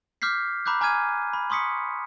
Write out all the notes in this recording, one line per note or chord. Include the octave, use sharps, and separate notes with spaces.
D6 F6 G6 B6 C7
A#5 B5 D6 F#6 G6
G#5 A#5 D6 F6 G#6 D#7
B5
C6 C#6 D#6 B6 C#7